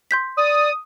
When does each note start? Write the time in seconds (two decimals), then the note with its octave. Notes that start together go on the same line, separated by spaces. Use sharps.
0.11 C6 G6 B6
0.37 D5 D#6